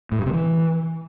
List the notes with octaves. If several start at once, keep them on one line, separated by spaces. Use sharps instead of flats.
A2
G2
C3
E3